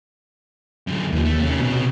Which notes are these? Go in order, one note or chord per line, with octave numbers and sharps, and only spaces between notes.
F#2 D3
D#2 E3 F3
A3
C3 C#4
B2